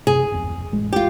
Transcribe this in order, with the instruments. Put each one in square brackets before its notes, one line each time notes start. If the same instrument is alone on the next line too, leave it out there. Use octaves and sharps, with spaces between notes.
[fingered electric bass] F#2 C3 [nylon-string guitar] G#4
[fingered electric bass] D1 G#1 F2
A1 G#3
[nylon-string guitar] F4 G4